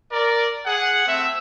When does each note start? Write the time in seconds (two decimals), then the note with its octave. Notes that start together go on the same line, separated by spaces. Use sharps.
0.11 A#4 D5
0.65 G#4 F#5
1.07 A3 C4 E5